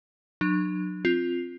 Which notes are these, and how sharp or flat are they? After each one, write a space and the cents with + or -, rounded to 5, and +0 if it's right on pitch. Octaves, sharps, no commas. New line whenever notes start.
F#3 -20 D4 +40
C4 +0 F4 +0